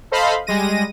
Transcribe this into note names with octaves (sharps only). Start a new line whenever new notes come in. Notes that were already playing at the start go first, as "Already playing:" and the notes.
A4 C5 D#5 F5 B5 C6
G3 G#3 A#6 D#7